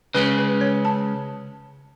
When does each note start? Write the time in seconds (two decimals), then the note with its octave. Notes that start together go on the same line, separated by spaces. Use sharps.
0.14 C#3 G#3 C#4 B4
0.38 B4
0.61 C#5
0.85 A5